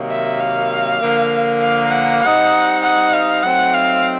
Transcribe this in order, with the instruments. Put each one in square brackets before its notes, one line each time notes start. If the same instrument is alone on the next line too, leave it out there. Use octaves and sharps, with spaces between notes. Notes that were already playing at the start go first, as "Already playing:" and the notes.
Already playing: [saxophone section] C3 D#3 F#3 A#3
[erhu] E5
F5
[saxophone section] D3 F3 A#3
[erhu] F5
F#5
[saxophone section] G3 C4 D#4 [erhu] F#5
[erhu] F#5
F5
[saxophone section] F#3 A3 C4 D#4 [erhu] F#5
[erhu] F5